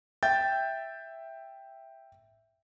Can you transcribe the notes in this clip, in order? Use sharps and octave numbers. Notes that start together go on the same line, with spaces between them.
E5 G5 G6 A6